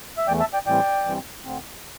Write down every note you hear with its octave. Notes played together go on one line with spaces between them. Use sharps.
E5
E2 E3 A3 D5 G5
E5 A5
D5 G5
A2 E3 G3 C4 D5 G5
G2 E3 G3 C4
D2 D3 C4